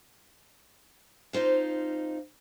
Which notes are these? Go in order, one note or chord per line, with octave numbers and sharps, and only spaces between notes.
F2 D#4 F4 C5 F5